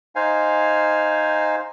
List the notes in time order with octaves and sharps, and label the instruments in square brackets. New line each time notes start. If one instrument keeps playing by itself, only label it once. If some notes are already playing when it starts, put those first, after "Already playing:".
[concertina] D#4 C5 F5 G#5